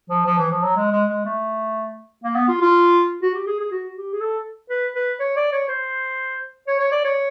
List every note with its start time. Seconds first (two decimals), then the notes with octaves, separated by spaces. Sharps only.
0.10 F3
0.26 F3
0.39 E3
0.51 F3
0.63 F#3
0.76 G#3
0.92 G#3
1.09 G#3
1.25 A3
2.24 A#3
2.36 B3
2.48 F4
2.61 F4
3.22 F#4
3.35 G4
3.47 G#4
3.60 G#4
3.71 F#4
3.97 G4
4.13 G#4
4.20 A4
4.70 B4
4.95 B4
5.20 C#5
5.36 D5
5.52 C#5
5.69 C5
6.67 C#5
6.79 C#5
6.92 D5
7.05 C#5